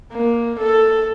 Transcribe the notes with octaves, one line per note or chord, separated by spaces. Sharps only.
A#3
A4